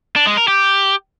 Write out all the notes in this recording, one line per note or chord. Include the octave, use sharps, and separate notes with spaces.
D4
G#3
A#4
G4